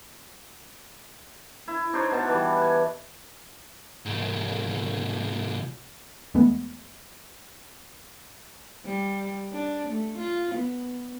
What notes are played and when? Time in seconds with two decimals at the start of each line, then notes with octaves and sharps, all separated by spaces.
1.68 E4
1.93 D4 D#4 C5 C#5
2.11 B2 A5
2.28 E3 G3
2.62 G#5
4.05 C2 G#2
6.34 E2 G#3 A3 B3
8.85 G3
9.52 D4
9.90 A3
10.18 F4
10.55 B3